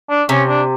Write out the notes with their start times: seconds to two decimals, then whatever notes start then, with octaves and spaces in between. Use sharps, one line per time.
0.10 D4
0.29 C3 C#4
0.48 D4